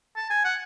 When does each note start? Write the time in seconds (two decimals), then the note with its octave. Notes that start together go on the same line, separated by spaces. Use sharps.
0.16 A5
0.30 G#5
0.44 F#5